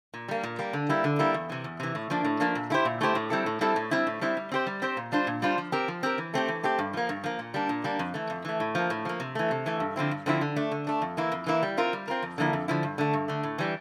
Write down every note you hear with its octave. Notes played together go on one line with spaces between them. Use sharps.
A#2
G3 A#3
A#2
G3 A#3
D3
G3 A#3 E4
D3
G3 A#3 E4
E2
C3 E3
E2
C3 E3
A2
F3 A#3 D4
A2
F3 A#3 D4
A#2
A3 E4 G4 C5
A#2
A3 E4 G4 C5
A2
G3 C4 E4 A4
A2
G3 C4 E4 A4
A2
G3 C4 E4
A2
G3 C4 E4
G3
C4 G4 C5
G3
C4 G4 C5
A#2
G3 D4 F4 C5
A#2
G3 D4 F4 C5
F3
C4 G4 A#4
F3
C4 G4 A#4
E3
A3 C4 G4
E3
A3 C4 G4
G2
F3 A#3
G2
F3 A#3
A#2
G3 A#3 D4
A#2
G3 A#3 D4
F2
E3 A3
F2
E3 A3
A2
F3 A#3
A2
F3 A#3
C3
E3 A3
C3
E3 A3
G2
D3 F3 C4 E4
G2
D3 F3 C4 E4
D3
A3 D4
D3
A3 D4
F2
E3 A#3 E4
F2
E3 A#3 E4
G3
C4 F4 A#4
G3
C4 F4 A#4
F2
D3 F3 A#3 E4
F2
D3 F3 A#3 E4
G2
D3 A3
G2
D3 A3
A2
E3 G3